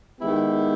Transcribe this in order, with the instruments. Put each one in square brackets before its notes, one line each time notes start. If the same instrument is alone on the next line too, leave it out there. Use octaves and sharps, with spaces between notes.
[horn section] D#3 G#3 B3 E4 G4